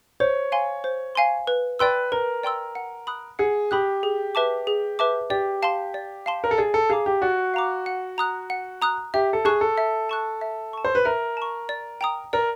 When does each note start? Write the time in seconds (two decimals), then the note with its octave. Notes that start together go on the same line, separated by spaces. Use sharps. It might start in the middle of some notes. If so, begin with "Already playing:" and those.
0.20 C5 C#5
0.52 F5 G#5 C6
0.84 C5
1.15 F5 G#5 C6
1.47 B4
1.79 B4 D5 G5 C6 E6
2.12 A#4 B4
2.43 D5 G5 C6 E6
2.75 F#5
3.07 B5 D#6 F#6
3.39 G#4 F#5
3.71 G4 B5 D#6 F#6
4.03 G#4
4.35 B4 E5 A5 D6
4.67 G#4
4.99 B4 E5 A5 D6
5.30 G4 D5
5.62 F5 A5 C6
5.94 D5
6.26 F5 A5 C6
6.44 A#4
6.51 A4
6.58 G#4 D5
6.74 A4
6.90 G#4 F5 A#5 D6
7.06 G4
7.22 F#4 D5
7.54 F5 A#5 D6
7.86 F#5
8.18 A#5 D#6 F#6
8.50 F#5
8.82 A#5 D#6 F#6
9.14 G4 E5
9.33 A4
9.45 G#4 A5 C#6 F#6
9.61 A4
9.78 E5
10.09 A5 C#6 F#6
10.41 E5
10.73 A5 C#6
10.85 C5
10.95 B4
11.05 A#4 E5
11.37 A5 C#6
11.69 D5
12.01 G5 A#5 D#6
12.33 A#4 D5